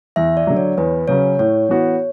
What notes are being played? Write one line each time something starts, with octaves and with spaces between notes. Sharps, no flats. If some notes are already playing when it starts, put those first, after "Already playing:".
E2 E5
D5
D3 F#3
C#5
E2 B4
C#3 F#3 C#4 C#5
A2 C#5
E3 B3 F#4